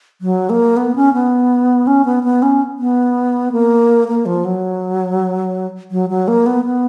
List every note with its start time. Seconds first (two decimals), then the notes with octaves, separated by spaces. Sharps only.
0.21 F#3
0.50 A#3
0.77 B3
0.96 C#4
1.13 B3
1.87 C#4
2.05 B3
2.23 B3
2.42 C#4
2.79 B3
3.52 A#3
4.08 A#3
4.26 F3
4.45 F#3
5.91 F#3
6.10 F#3
6.28 A#3
6.46 B3
6.65 B3